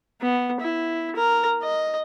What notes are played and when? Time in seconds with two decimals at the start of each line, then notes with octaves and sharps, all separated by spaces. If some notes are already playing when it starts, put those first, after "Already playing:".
0.21 B3
0.61 E4
1.16 A#4
1.63 D#5